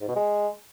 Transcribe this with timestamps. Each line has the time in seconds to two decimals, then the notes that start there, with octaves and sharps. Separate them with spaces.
0.01 G#2
0.08 B2
0.15 G#3